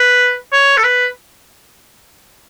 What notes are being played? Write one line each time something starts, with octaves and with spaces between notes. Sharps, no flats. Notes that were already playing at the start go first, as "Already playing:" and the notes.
Already playing: B4
C#5
A4
B4